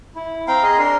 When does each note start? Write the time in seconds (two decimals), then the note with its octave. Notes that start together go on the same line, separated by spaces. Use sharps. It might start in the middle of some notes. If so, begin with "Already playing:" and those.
0.16 E4
0.48 C4 F5 G5 A#5
0.63 G#4 D#5 C6
0.78 D4 A#4 C6